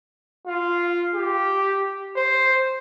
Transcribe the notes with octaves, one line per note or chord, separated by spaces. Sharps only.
F4
G4
C5